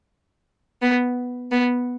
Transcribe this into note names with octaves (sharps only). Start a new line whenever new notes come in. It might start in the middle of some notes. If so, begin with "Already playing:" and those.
B3
B3